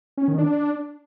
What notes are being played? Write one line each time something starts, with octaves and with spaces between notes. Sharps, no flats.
C#4
D#3
D4